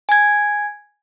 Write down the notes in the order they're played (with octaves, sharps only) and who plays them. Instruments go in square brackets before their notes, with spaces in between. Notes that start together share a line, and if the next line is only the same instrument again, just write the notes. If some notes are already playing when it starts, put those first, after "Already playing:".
[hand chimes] G#5 G#6